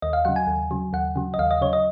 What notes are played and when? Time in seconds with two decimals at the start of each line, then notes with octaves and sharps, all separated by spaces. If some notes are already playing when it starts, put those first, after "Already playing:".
0.02 D#2 D#5
0.13 F5
0.25 C#3 F#3 F#5
0.36 G#5
0.47 D#2
0.71 C#3 F#3
0.93 D#2 F#5
1.16 C#3 F#3
1.34 D#5
1.38 D#2 F5
1.51 D#5
1.61 C#3 F#3 C#5
1.73 D#5